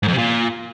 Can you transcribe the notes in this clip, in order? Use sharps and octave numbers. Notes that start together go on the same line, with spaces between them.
G#2
F2
C3
A#2